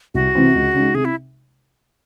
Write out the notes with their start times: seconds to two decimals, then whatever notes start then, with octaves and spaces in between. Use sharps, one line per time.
0.14 C2 F#4
0.35 C3 E3 C4
0.55 C#2
0.74 C#3 G#3 D#4
0.94 C3 G#4
1.05 E4